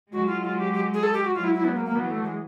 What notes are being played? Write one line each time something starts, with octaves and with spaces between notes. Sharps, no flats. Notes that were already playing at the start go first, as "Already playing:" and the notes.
F#3 G#3 F#4
F4
F4
G4
G4
G#4
A4
G4
F#4
F#3 G#3 F4
E4
E4
B3
A#3
A#3
E3 F#3 B3
A3
G#3